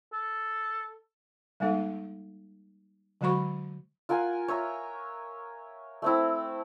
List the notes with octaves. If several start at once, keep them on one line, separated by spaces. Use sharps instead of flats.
A4
G3 G#3 A#3 D#4 A4
D3 F#3 G#3 F#4 B5 C#6
F4 A#4 F#5 G#5
C#5 E5 A#5
A3 C4 E4